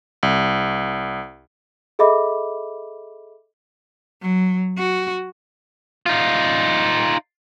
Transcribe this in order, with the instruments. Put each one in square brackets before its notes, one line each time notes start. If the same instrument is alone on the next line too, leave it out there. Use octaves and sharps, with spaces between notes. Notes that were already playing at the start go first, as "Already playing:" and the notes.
[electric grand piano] C2
[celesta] G#4 A4 D#5 E5 B5 D6
[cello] F#3
F#4
[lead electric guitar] D#4 F4